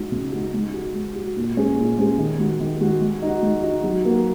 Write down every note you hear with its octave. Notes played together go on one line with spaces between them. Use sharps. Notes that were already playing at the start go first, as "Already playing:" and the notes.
Already playing: G#3 D#4 F#4
C#3
G#3 D#4 F#4
G#3
F#4
G#3
F#4
A#2
G#3 C#4 G#4
A#2
G#3 C#4 G#4
D#3
G#3 F#4
D#3
G#3 F#4
G#3
D#4 F#4
G#3
D#4 F#4
F#3
A#3 F#4